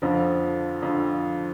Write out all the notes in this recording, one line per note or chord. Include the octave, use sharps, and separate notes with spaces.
F2 D3 F3
F2 D3 F3